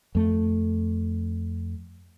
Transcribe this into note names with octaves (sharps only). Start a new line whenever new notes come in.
F2 A3